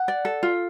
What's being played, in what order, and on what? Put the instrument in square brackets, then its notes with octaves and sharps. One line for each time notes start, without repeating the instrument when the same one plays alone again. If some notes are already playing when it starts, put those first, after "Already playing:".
Already playing: [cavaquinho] F#5
[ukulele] D5
A4
F4